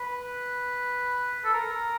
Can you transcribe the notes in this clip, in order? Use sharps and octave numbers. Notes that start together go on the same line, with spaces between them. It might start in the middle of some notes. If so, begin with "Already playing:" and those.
Already playing: B4
A4
A#4